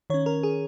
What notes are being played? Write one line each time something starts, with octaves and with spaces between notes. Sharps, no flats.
D#3 C#4 C#5
A#4
G#4